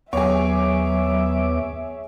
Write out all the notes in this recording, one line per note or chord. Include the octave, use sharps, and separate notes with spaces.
D#2 F#3 B3 G#4 C#5 E5 D6